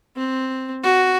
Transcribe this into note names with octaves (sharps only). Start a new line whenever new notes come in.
C4
F#4